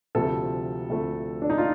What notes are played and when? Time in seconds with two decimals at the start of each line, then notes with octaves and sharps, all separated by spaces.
0.15 D2 C3 F3 A3 A4
0.90 D2 C3 F3 A3
1.42 D4
1.50 D#4
1.58 F4